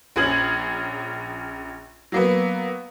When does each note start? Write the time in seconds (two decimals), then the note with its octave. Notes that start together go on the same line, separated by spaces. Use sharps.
0.16 A#1 C#4 G#4 G#6 F#7
2.12 F#3 A#3 B3